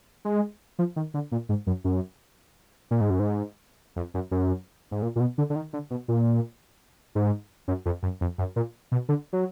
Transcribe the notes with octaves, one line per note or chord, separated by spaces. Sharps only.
G#3
F3
D#3
D3
A#2
G#2
F#2
F#2
A#2
G#2
F#2
G#2
F2
F#2
F#2
G#2
A#2
A#2
B2
D3
D3
D#3
D3
B2
A#2
G#2
F#2
F2
F#2
F2
F#2
A#2
B2
D3
F#3